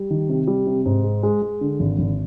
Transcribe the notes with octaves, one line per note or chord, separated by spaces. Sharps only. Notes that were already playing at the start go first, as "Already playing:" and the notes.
Already playing: G3
D#3
C3
G3
C3
G#2
G#3
G#3
G#3
D3
G#1
G#1